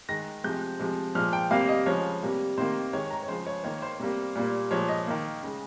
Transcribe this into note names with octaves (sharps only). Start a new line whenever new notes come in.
D#3 G#3 A#6
C3 F3 G#3 G6
C3 F3 G#3
A#2 F3 G#3 F6
G5
C3 G3 A#3 F5
D#5
C#3 F3 G#3 C#5
C3 G3 A#3
C3 D#3 A#3 C5
D#3 G#3 C#5
A#5
C#5
C#3 F3 G#3 C5
C#5
D#3 A#3 C#5
C5
C3 G3 A#3
A#2 G3 A#3
A#2 F3 G#3 C#5
D#5
D#3 A#3
C#3 G#3